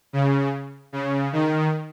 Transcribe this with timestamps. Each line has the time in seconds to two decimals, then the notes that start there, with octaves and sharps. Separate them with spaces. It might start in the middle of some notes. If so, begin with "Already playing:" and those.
0.13 C#3
0.93 C#3
1.33 D#3